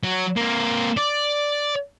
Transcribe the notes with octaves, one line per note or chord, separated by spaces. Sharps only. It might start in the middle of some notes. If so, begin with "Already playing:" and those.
F#3
A#3 C4
D5